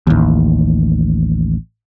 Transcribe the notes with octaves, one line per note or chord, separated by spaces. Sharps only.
A1 D#2